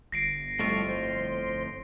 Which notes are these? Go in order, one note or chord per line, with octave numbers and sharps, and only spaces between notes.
G1 A#6 C7 D7
F2 A2 G3 A3 F4 C#6
C5